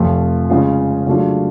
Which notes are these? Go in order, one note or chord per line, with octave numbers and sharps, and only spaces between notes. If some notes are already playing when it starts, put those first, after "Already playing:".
Already playing: F1 F2 F3 A3 F4
C#3 G#3 C#4 F4
C#3 F#3 A3 D4 F4